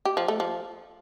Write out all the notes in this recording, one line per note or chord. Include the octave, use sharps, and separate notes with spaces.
G4
F3
A3
F3